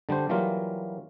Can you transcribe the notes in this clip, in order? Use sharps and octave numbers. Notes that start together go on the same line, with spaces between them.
D3 G3 D4 C5
E3 F#3 G3 A#3 F4